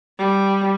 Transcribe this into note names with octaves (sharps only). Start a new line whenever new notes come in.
G3